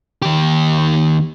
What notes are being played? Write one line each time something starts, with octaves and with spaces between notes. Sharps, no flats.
D#2 G4